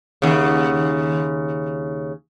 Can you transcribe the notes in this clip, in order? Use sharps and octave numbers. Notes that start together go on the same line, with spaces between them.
D#2 C#3